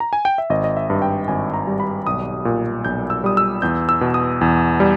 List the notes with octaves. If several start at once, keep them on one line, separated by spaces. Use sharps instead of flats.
A#5
G#5
G5
E5
G#1 D#5
D#5
E5
G2
G5
G#1 G#5
A#5
G3
B5
B1 D#6
A#2
B1 G6
E6
G3 D#6
E6
E2 G6
E6
B2
D#6
E2
G3